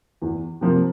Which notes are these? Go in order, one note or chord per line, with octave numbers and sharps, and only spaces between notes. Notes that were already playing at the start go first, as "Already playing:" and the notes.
E2
C3 F3 A#3